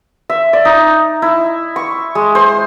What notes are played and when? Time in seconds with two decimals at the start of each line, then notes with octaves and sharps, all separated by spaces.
0.30 E5
0.53 D5
0.65 D#4
1.22 E4
1.76 C#6
2.15 G#3
2.35 C5